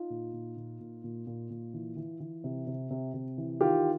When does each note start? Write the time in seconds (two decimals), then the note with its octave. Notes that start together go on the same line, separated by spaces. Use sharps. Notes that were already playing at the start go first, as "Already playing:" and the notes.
Already playing: D#4 F4
0.10 A#2
0.33 A#2
0.57 A#2
0.80 A#2
1.04 A#2
1.27 A#2
1.50 A#2
1.74 E3
1.97 E3
2.20 E3
2.44 C3
2.67 C3
2.91 C3
3.14 C3
3.38 E3
3.61 D#3 F4 G4